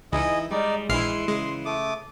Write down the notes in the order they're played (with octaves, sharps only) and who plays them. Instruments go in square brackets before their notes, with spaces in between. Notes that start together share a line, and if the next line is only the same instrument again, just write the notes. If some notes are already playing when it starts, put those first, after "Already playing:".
[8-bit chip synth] C#2 [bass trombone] E3 [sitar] D#4 E4 [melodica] G#4 D#5
[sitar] G3 [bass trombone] G#3 [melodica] D#4 D5
[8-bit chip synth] A#1 F6 C7 [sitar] E3 E4 [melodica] C6
[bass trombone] C#3 [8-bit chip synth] G#3
[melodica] A3 D6 D#6